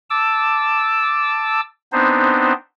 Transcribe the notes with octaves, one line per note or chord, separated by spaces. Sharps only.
A5 D6 E6
B3 C4 D4 D#4 C5